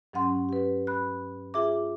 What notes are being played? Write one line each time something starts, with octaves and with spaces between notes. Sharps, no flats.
G2 F#3 C#4 F#5 C6
G4 B4
B5 F#6
F4 G#4 E5 D6